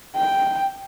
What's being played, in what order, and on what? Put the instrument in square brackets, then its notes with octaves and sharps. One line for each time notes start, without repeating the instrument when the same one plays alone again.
[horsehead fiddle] G5